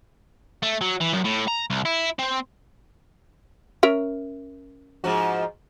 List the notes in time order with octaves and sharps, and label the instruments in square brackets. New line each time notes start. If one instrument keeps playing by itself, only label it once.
[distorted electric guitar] A3
F#3
E3
F#2
A2
A#5
C2
E4
C4
[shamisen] C#4 A#4 E5
[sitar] G#2 F3 F#4